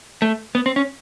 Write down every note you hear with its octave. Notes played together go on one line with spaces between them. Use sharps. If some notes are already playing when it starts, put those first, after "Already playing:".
A3
B3
C4
C#4